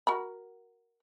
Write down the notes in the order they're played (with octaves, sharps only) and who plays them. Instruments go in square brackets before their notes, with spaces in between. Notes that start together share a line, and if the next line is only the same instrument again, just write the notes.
[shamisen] F#4 A#4 B5